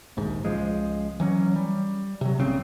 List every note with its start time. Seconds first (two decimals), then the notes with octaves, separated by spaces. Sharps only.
0.17 A#1 D#2 G#2
0.45 C#2 F3 G#3
1.20 E3 F#3 C#4
1.56 G3
2.21 C3 F#3
2.38 A#1 G#2 C#3 C4